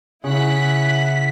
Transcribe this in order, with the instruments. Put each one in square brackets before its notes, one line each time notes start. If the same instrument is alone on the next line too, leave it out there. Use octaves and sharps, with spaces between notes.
[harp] C#3 [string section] E4 F#5 F#6 [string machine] B6